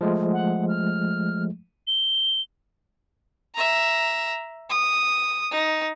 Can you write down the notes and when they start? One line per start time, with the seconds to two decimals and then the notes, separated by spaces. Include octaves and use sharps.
0.01 F3 G#3 A3
0.33 F#5
0.69 F6
1.87 G7
3.55 E5 A#5
4.70 D#6
5.51 D#4